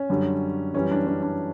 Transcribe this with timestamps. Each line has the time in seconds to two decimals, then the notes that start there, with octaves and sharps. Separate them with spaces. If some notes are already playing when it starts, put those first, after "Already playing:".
Already playing: C#4
0.10 F#2 D3 G3
0.74 F#2 E3 G3 C#4
0.91 D4
1.07 C#4
1.23 D4